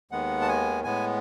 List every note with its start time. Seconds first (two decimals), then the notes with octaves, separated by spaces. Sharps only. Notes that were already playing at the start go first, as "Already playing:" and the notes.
0.11 D#2 D#3 G#3 B3 F#5
0.42 A5
0.49 G#5
0.84 A2 G#3 B3 G#5